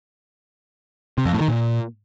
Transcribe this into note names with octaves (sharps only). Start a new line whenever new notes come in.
C3
F2
A2
D#3
A#2